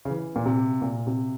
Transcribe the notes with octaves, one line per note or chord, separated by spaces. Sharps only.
C#3
E3
A#2
C3
A#2
C3